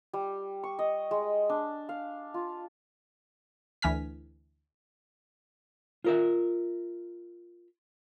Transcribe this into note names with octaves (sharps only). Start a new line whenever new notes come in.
G3
C#6
D#5
G#3
D4
F5
F4
D2 E3 G#5 F6 B6
F4 A#4 E5